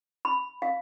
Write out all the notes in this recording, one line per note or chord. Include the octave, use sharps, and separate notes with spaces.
B5
F5